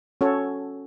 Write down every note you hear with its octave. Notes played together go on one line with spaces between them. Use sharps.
C#4 F#4 A4 C#5